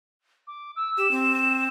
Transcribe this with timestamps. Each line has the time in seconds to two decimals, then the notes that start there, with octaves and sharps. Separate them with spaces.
0.47 D6
0.76 E6
0.98 G4 E7
1.11 C4